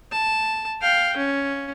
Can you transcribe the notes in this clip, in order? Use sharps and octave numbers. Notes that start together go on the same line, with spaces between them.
A5
F5 G5
C#4